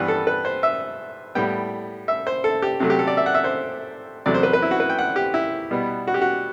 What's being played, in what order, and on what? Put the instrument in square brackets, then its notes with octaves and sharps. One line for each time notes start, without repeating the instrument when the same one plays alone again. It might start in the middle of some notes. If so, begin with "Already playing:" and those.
Already playing: [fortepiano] G2 E3 G3 B3 B4
A4
B4
C5
E5
A2 G3 B3 G5
E5
C5
A4
G4
C3 F#3 A3
G4
A4
D5
E5
F#5
E5
C5
E2 C3 F#3 A3 D5
C5
B4
B4
E4
F#4
B4
G5
F#5
G4
E4
B2 G3 B3
F#4
G4
F#4